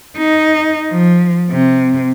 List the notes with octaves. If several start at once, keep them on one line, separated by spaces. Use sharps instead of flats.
D#4
F3
C3